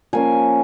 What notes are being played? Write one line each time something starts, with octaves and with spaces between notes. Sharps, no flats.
F3 A#3 C#4 G#5